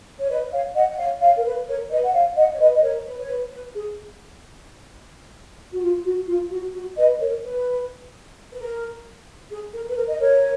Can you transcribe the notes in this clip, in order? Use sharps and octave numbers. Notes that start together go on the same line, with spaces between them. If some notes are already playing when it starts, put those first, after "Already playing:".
C#5
B4 D#5
C#5 F5
D#5 F#5
F#5
C#5 F5
C#5 F5
A#4
B4
A#4 C#5
B4 D#5
F#5
C#5 F5
D#5 F#5
C#5
B4 D#5
D#5
A#4 C#5
B4
C#5
B4
B4
G#4
F#4
F4
F#4
F4
F#4
F#4
B4 D#5
A#4 C#5
B4
B4
A#4
G#4
A#4
B4
A#4
D#5
A#4 C#5